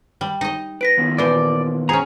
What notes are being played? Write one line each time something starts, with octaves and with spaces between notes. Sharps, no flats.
G3
D#4 D#5
B4 A#6 B6 D7
D#3 A#3 B3
A#2 E3 C5 D5
C#4 G#4 C5 A#5